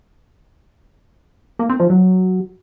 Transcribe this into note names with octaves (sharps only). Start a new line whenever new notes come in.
A#3
C4
F3
F#3